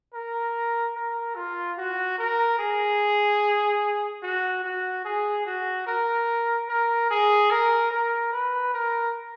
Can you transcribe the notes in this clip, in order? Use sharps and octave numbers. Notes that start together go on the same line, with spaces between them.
A#4
A#4
F4
F#4
A#4
G#4
F#4
F#4
G#4
F#4
A#4
A#4
G#4
A#4
A#4
B4
A#4